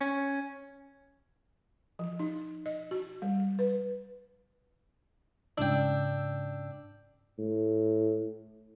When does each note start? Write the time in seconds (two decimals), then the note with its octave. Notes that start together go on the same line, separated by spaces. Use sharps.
0.01 C#4
1.99 F3
2.19 D#4
2.66 D#5
2.91 F#4
3.22 G3
3.59 B4
5.58 G#2 C#3 D4 G5 E6
7.38 A2